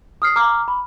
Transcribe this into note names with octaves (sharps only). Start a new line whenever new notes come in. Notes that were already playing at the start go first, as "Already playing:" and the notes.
D#6 F6 C7
A#5 D6 F6
B5